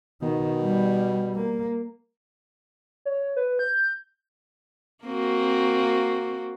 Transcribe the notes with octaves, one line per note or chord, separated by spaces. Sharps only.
B2 D#3
G3
A#3
C#5
B4
G6
A#3 C4 F#4